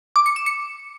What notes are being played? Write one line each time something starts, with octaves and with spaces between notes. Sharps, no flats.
D6
C#7
E7
C#7